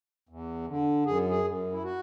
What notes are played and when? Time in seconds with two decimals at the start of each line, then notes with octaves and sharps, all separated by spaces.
0.29 E2
0.67 D3
1.06 F#2 G#4
1.30 G#4
1.45 F#2
1.72 E4
1.83 F#4